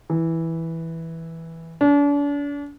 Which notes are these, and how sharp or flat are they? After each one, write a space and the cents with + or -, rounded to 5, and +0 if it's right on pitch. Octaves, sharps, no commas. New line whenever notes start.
E3 -5
D4 -40